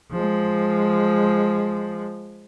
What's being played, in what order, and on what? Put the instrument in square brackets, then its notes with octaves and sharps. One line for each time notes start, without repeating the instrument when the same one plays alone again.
[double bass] F3 G#3